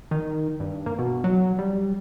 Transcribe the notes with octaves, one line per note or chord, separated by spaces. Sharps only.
D#3
G2
A#3
B2
F#3
G3